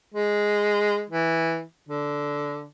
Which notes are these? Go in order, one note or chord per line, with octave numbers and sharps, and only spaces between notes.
G#3
E3
D3